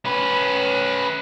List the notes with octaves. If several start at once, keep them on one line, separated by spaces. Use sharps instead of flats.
C#4 B4